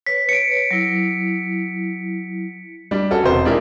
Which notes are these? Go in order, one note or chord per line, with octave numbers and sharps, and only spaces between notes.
B4 C#5 B6
C#7 D7
F#3 E4
G3 D4
C#4 F#4 A4
E1 C3 C5
G#3 D4 E4 G4 A#4